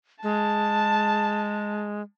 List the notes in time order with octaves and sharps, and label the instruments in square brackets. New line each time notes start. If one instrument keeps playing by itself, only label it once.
[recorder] G#3 [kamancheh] A5